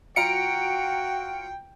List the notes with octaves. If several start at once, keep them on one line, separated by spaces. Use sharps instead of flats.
F#3 F4 F#4 G5 A#5 C#7 D7